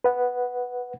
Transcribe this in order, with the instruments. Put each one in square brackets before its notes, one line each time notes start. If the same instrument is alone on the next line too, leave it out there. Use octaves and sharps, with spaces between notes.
[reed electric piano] B4 F#5